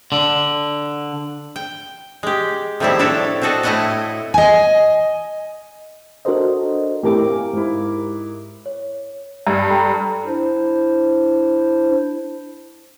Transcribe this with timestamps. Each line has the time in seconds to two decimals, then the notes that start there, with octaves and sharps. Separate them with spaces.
0.12 D3
1.56 G5
2.23 G#3 G4
2.80 A2 D#3 F3 G3 C4 E4
2.99 C4 D4 E4 A4 C#5
3.42 C4 D4 F#4 A4 D#5
3.63 A2 A3 E4 D#5 F#5 G#5
4.34 D#5 G#5
6.25 D4 F#4 A4 A#4 C5 D#5
7.03 A2 C4 E4 G4 A#4 D6
7.28 F5 G#5
7.53 G#2 E4
8.66 C#5
9.47 G2
9.70 A4 G5 A#5
10.26 D4 E4 C5